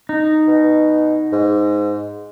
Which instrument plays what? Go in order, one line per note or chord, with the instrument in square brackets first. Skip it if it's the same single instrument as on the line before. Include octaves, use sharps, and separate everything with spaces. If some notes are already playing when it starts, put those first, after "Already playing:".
[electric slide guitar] D#4
[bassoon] B2
G#2